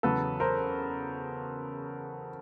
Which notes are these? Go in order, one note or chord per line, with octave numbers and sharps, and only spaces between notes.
E2 C#3 F#3 A4 B4
A#4 C5